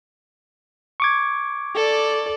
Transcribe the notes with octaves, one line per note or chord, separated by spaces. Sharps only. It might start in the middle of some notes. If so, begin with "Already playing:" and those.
C#6 D6 G#6
A4 D5